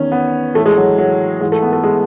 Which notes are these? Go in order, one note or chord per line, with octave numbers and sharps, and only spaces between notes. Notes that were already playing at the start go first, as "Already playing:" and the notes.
Already playing: E2 D#3 C#4
B3
A2 E3 A3
G#3
F#3
F#3
G#2 E3 G#3
A3
B3
A3
G#3